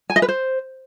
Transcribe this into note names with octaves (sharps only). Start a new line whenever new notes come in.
G#5
D#5
B4
C5